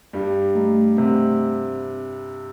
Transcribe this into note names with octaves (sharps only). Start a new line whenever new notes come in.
G2 G3 G4
A3
C3 C4